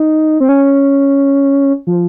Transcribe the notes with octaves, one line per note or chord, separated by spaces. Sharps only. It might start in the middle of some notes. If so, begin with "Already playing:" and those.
Already playing: D#4
C4
C#4
F3